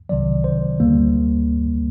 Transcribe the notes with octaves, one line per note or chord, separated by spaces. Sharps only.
C2 C3 D#3 F#3 D5
C5
D2 D3 G3 A#3